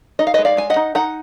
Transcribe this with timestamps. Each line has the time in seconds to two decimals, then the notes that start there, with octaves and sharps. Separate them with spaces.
0.19 D#4 D#5
0.27 F5
0.34 G#3 B4 D#5
0.45 D5 F5
0.57 G#3 G#5
0.70 D#5 F#5
0.76 D#4
0.95 D#4 F#5 A#5